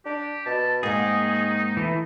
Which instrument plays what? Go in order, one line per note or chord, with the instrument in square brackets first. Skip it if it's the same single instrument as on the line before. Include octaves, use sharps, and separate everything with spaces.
[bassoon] D4 [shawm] G4
[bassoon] B2 [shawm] A5
[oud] G#2 A#3 [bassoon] D#3 [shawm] D#4 [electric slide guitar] G#4
[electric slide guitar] E3 A3